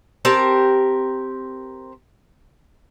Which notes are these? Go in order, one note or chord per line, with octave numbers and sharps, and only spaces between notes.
C4 G4 A#4 A5